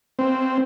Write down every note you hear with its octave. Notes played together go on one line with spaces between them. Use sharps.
C4